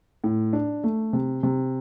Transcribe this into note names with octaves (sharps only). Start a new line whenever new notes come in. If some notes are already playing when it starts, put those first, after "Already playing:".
A2
D4
A3
C3
C3